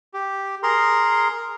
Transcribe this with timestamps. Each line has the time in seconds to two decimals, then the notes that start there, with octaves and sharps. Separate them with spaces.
0.14 G4
0.63 G#4 A#4 A#5 C6